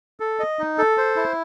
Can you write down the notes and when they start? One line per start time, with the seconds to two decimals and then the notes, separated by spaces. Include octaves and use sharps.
0.20 A4
0.39 D#5
0.59 D#4
0.78 A4
0.98 C5
1.16 E4